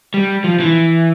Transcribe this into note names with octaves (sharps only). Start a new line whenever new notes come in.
G3
F3
E3